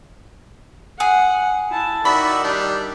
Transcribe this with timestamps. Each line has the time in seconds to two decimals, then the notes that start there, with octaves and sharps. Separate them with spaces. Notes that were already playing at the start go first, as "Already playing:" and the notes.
1.00 G#4 F#5
1.70 E4 A5
2.05 D#3 D#4 F#4 D5 E5 B5
2.44 G3 D4